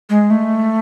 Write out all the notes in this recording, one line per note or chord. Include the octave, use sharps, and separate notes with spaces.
G#3
A3